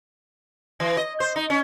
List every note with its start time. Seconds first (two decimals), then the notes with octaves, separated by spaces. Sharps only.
0.80 E3
0.97 D#5
1.20 C5
1.36 D#4
1.50 C#4